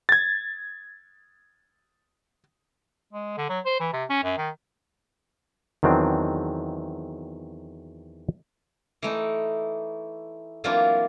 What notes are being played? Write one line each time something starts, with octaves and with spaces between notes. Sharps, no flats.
G#6 A6
G#3
D3
F#3
C5
E3
C3
C#4
F#2
D#3
E2 D#3 F#3 C4 D4
E3 A3 D#4
E3 F#3 A#3 C4 D4 F4